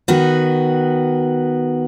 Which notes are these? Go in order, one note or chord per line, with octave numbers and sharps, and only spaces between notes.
D#3 B3 F#4